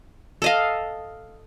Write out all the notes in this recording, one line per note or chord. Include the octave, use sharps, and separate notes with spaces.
A4 D#5 F5